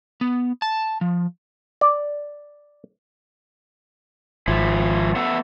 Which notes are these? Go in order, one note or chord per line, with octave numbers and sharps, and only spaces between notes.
B3
A5
F3
D5
G#1 F3 E4
A3 B3 E5